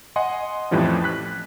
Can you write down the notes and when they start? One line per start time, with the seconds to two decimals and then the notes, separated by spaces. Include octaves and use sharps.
0.16 D#5 F#5 G#5 C6
0.71 F2 A2 E3 F3 G3 C#4
1.04 F#6 B6